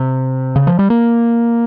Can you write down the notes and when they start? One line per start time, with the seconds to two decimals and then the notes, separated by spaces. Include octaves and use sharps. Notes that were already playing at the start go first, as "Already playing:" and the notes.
Already playing: C3
0.56 C#3
0.67 F3
0.79 G3
0.90 A#3